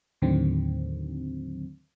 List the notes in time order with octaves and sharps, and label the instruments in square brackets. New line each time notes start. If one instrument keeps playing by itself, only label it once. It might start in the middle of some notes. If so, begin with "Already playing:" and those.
[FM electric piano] D#2 A2 D3 D#3 F#3 C4